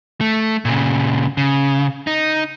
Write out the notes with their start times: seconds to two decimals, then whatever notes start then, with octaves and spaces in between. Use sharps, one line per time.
0.21 A3
0.65 A#2 C#3
1.37 C#3
2.07 D#4